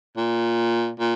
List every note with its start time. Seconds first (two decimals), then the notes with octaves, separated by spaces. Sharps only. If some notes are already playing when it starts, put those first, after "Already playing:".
0.17 A#2
1.00 A#2